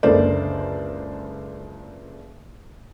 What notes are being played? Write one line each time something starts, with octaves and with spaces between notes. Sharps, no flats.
F#1 C#2 D3 A#4 C5 D5